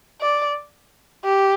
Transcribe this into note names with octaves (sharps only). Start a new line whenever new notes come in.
D5
G4